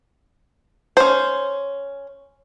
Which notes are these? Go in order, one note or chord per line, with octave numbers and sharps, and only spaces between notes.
C#4 C5